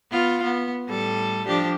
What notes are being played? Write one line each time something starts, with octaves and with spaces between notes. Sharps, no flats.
B3 F4
B3
A2 G3 A4
F3 D4 G4